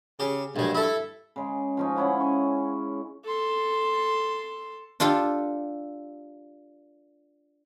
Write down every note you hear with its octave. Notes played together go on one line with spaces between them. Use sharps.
C#3 G4
A#1 G2 F#3 G#3
E4 A4 E5
C#3 G#3
F3 C#4 D#4
C#3 C#4 E4 F#5
G#5 C#6
A4 C6
D4 F4 G4 A4